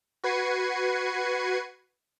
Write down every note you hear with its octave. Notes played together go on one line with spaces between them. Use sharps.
F#4 B4 G#6 C7 C#7 D#7